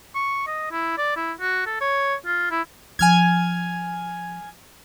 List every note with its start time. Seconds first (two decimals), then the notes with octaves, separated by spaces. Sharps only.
0.15 C#6
0.47 D#5
0.72 E4
0.98 D5
1.16 E4
1.40 F#4
1.66 A4
1.81 C#5
2.26 F4
2.51 E4
2.99 F3 G#5 F6 G#6